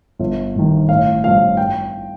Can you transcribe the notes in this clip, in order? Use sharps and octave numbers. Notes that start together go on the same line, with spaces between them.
G1
G2 D#3
A1 F5
G2 F3 F5
G5